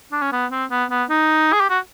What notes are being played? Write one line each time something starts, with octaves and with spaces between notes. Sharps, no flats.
D4
C#4
B3
C4
B3
B3
D#4
G#4
G4
F#4